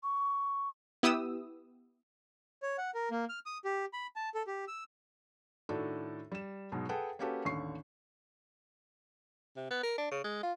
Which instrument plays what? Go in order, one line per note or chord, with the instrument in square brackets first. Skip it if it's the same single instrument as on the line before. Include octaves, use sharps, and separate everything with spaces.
[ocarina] C#6
[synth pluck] B3 E4 G4 B4 D#6 E6
[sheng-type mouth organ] C#5
F#5
A#4
A#3
F6
D#6
G4
B5
A5
A4
G4
E6
[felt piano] A2 D#3 D4 F#4 A4
G3 E7
G#2 B2 F#3 G#3
G#4 A4 B4 F#5 G5
A#3 C#4 F#4 G4 A4 B4
A1 D#2 D3 C#6 C7
[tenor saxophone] C3
B3
A#4
D4
C#3
G#3
F4